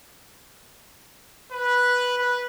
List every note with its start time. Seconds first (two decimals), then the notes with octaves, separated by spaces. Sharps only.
1.51 B4
2.16 B4